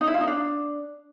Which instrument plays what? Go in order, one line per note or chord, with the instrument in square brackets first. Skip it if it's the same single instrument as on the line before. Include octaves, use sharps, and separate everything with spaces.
[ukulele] D#4
E4
F4
D#4
D4